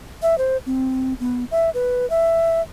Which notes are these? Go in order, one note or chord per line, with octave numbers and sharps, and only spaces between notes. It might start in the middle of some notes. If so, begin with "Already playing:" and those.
E5
C5
C4
B3
E5
B4
E5